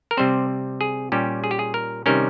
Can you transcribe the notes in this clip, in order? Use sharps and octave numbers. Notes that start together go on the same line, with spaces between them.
A#4
C3 G3 C4 C5
G#4
A#2 G3 C#4 G4
G#4
G4
G#4
A#4
C3 D#3 G3 C#4 A#4